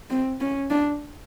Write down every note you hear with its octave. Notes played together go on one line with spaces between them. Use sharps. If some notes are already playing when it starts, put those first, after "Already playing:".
C4
C#4
D4